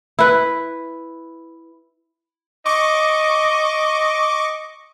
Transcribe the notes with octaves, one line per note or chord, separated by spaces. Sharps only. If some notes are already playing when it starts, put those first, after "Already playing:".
E4 B4
D#5 C#6 D6